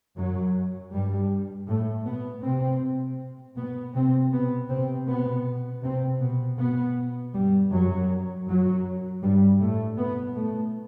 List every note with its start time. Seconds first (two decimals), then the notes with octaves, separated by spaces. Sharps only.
0.17 F#2 F#3
0.93 G2 G3
1.69 A2 A3
2.06 B2 B3
2.44 C3 C4
3.57 B2 B3
3.95 C3 C4
4.33 B2 B3
4.70 C3 C4
5.08 B2 B3
5.83 C3 C4
6.21 B2 B3
6.59 B2 B3
7.34 G2 G3
7.71 F#2 F#3
8.47 F#2 F#3
9.23 G2 G3
9.60 A2 A3
9.98 B2 B3
10.36 A2 A3